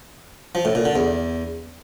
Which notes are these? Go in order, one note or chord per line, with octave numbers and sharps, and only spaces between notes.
F3
A2
A#2
D3
E2